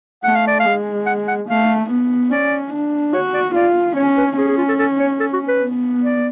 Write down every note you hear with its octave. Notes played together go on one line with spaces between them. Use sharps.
A3 F#5
F5
D5
F5
G#3
F#5
F#5
A3 F5
B3
C#4 D5
D4
F#4 C#5
D5
F4 D5
C#4 C#5
B4
C#4 G#4
G#4
F4
A4
A4
C#5
A4
F#4
B4
B3
D5